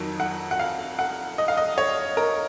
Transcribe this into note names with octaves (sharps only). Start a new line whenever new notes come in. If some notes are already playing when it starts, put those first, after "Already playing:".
Already playing: F2 D#3 F#3
F#5
F#5
F5
F#5
D#5
F5
D#5
C#5
A#4